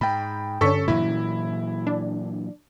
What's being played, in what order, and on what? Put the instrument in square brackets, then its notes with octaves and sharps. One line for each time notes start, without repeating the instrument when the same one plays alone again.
[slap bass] G#2 [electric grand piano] G5 B5
[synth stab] G2 D3 C#4 [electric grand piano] A4 C#6 B6
[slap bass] A#2 E3 F#3 [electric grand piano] E4
[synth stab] D4